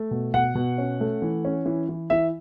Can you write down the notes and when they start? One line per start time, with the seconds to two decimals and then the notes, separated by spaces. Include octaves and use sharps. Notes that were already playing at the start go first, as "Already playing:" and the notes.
Already playing: A3
0.11 B2
0.34 B2 F#5
0.55 B2
0.78 C#4
1.01 A3
1.22 E3
1.45 C#4
1.66 E3
1.89 E3
2.10 E3 E5